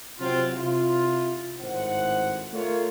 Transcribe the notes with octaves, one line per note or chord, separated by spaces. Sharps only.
C3 F#3 C4 F4
C3 E4 F4
G#1 A2 C5 F#5
A3 F4 A#4 C#5